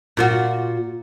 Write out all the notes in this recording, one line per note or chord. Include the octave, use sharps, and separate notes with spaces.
A#2 F4 F#4